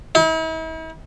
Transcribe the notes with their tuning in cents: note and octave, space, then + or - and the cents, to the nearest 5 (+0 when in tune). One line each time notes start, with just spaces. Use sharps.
E4 -45